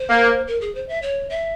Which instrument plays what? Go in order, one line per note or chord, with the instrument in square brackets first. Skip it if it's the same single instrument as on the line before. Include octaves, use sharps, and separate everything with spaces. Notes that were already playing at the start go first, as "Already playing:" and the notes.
Already playing: [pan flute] C5
[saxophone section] A#3
[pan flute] A#4
G#4
C5
E5
C#5
E5